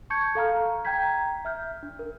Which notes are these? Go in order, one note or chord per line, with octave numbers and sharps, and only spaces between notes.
A5 C#6 G6 G#6 C#7
A4 F5 A#5 F6
G5 A#5 G6 G#6 B6
E5 F6 G6
D4
A#4